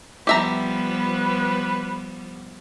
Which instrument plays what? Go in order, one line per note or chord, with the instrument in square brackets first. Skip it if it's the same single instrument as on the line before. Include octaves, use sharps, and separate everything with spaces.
[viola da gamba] F3 G3 B3 [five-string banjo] G4 E5 A#5 [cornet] B4